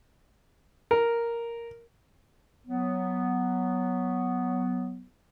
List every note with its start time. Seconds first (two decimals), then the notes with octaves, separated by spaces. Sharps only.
0.91 A#4
2.66 F#3 B3